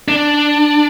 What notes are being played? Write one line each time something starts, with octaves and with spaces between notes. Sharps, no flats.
D4